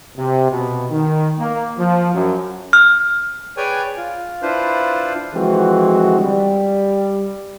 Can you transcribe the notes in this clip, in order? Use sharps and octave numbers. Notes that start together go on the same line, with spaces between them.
C3
B2
D#3
A#3
F3
F#2
F6
G#4 B4 C#5 D5 G5 G#5
F4
D4 E4 F4 B4 C5
D3 E3 F3 G#3 C4 F#4
G3